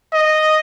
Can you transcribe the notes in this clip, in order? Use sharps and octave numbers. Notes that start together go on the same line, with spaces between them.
D#5